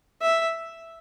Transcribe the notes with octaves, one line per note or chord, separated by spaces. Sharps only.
E5